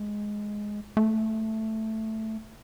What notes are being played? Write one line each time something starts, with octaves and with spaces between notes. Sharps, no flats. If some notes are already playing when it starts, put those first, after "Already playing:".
Already playing: G#3
A3